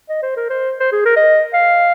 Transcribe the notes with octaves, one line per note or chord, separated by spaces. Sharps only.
D#5
C5
A#4
C5
C5
G#4
A#4
D#5
F5